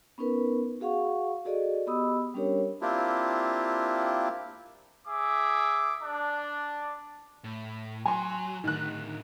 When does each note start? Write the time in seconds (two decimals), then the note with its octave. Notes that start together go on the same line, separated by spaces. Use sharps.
0.18 B3 C#4 D#4 A#4 B4
0.80 F#4 G#4 F5 F#5 C#6
1.45 F#4 G#4 A4 D5 D#5
1.87 B3 G4 D#5 B5 D#6 E6
2.34 G3 C#4 D4 G4 A#4 C#5
2.81 A#3 C4 D4 E4 F4 G4
5.08 G#4 E5 D6
6.02 D4
7.44 A2
8.06 F#3 G#5 C6
8.64 A2 D3 D#3 F#6